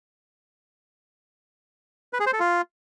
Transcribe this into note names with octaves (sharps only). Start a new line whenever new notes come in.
B4
G#4
C5
A4
F4